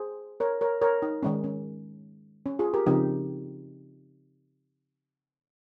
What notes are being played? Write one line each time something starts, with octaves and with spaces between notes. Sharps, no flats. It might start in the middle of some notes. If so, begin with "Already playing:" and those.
Already playing: G#4 C5
A#4 C#5
A#4 C#5
A#4 C#5
D#4
D#3 G#3 C#4
C#4
C#4
F4 G#4
G4 A#4
C#3 F3 C4 D#4 G4